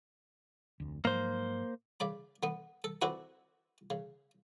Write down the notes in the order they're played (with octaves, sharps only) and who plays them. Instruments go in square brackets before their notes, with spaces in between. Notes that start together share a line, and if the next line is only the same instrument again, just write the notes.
[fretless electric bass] F1 D2
[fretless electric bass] G#2 F3 F#3 [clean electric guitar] A#3 C5
[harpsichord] C#3 D5 B5
D3 B3
A4
D3 C4 D4 E4 F#4 B4
C#3